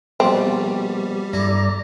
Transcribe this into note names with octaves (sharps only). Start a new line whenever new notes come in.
A#1 B2 G3 C4
G2 E4 A4 D5 A#5